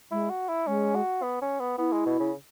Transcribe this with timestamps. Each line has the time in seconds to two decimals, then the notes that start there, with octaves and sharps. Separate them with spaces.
0.11 G#3 E4
0.30 F#4
0.49 E4
0.67 G#3 C#4
0.96 F#4
1.23 B3
1.42 C#4
1.60 B3
1.78 B3 E4
1.93 G#3
2.06 B2
2.20 C#3